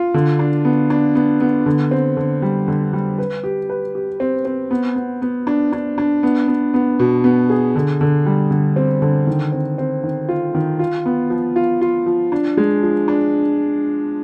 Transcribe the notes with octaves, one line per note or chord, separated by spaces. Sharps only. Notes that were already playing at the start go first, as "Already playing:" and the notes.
Already playing: F4
D3
D4
B3
D4
B3
B3
D3
C4
D3
G3
D3
G3
B4
G4
B4
G4
C4
C4
B3
B3
B3
D4
D4
D4
B3
B3
B3
B2
B3
G#4
D3
D3
G3
D3
C4
D3
D#3
C4
C4
D#3
F4
D#3
F4
B3
F3
F4
F4
F3
D4
G#3
F3
D4